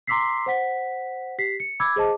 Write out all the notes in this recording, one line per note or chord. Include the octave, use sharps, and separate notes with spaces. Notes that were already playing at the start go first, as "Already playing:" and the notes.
A#5 C6 D6 E6 B6 C7
C5 F#5 B6
G4 B6 C7
C#7
B5 D6 E6 G#6
G#4 C5 D#5 A5 D6